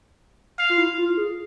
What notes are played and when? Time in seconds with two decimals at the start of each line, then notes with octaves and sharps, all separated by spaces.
0.59 F5
0.69 F4
0.78 E4
0.98 F4
1.17 G#4